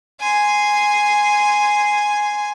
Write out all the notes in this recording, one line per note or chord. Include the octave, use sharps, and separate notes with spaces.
G#5 C6